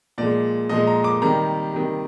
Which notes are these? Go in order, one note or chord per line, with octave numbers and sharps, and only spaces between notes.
A#2 F3 G#3 D5
A#2 F3 G#3 D#5
A#5
D6
C3 D#3 G3 A#5
C3 D#3 G3